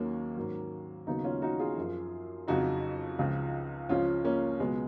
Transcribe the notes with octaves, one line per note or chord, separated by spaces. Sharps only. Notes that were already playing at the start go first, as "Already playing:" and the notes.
Already playing: D#2 D#3 F#3 A#3 C#4
G#2 D#3 F#3
D#2 C#3 F#3 B3 D#4
C#4 F4
D#4 F#4
F4 G#4
F#2 F3
F2 C#3 F#3 D#4 F#4
C#2 C#3 F3
C#2 C#3 F3 C#4 F4
A#3 C#4
C#2 B2 F#3 G#3 B3